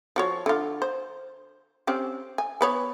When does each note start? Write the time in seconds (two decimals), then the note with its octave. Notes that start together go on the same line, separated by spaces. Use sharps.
0.16 F3 F#4 C#5
0.46 D3 F4
0.82 C5
1.87 C4 C#4 G4
2.38 G#5
2.61 B3 B4 C#5